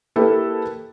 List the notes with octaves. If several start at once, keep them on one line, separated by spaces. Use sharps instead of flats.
A#3 E4 G4 A4 B4